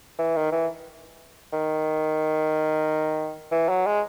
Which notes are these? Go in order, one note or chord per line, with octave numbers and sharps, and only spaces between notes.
E3
D#3
E3
D#3
E3
F#3
G#3